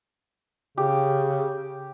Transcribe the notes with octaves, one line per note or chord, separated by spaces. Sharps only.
C#3 G4